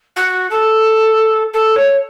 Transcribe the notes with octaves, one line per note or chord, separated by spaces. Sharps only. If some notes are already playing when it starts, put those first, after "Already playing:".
F#4
A4
A4
C#5